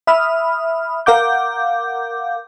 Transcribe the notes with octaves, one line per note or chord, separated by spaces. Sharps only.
E5 B5 D#6 F6
A#4 F5 F#5 D6 G6